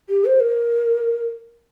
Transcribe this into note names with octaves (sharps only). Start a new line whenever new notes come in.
G4
C5
A#4